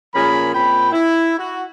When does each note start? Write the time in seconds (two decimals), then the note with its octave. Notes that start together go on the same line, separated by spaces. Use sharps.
0.15 A#2 F3 C#4 G#4 A#4 B5
0.55 A#2 C4 G5 B5
0.92 E4
1.38 F#4